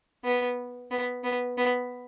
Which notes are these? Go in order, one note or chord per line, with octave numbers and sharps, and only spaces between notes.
B3
B3
B3
B3